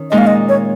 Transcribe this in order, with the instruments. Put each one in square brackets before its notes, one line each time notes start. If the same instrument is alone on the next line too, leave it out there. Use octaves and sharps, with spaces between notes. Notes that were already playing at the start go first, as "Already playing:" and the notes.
Already playing: [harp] D#3 C#4
[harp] A#2 G#3 D#4 [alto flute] D#5
[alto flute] F5
D#5
C#5